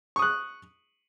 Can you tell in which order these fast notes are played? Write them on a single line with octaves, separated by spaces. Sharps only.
C#6 D#6 F#6